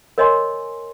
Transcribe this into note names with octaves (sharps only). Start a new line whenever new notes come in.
A#4 C#5 D#5 G#5 C6